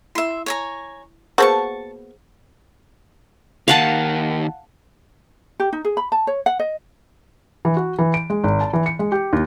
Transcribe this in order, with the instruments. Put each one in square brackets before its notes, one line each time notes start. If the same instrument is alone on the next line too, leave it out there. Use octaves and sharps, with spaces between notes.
[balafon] E4 [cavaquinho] E5 C6
[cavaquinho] C#5 G#5 A#5
[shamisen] A#3 B3 F#4 [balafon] G#4 C5 [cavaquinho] A5 A#5 C#6
[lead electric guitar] D#2 D#3 [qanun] F5 F#5 A5
[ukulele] G4
D#4
G#4
B5
A5
C#5
F#5
D#5
[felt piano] E3
F#4
E3
D7
G#3
G#1
A5
E3
C#7
G#3
G4
D#2